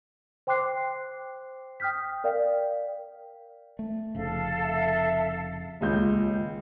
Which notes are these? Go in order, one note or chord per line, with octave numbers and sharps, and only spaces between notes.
C5 G5 C6 D6 F#6 C7
G5 D#6 F6 G6 B6
A#4 D5 F5 G5
A3
F1 F2 C#3 A4 F5
E5
D#1 C#2 G6